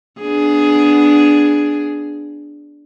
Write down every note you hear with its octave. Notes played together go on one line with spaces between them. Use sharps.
B3 D4 G#4